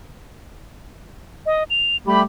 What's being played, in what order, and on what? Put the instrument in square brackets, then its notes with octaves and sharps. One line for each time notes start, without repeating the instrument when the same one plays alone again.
[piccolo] D#5
F7
[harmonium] G3 A3 G4 [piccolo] B5